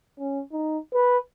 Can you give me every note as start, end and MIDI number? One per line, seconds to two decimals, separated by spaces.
0.19 0.41 61
0.52 0.78 63
0.94 1.18 71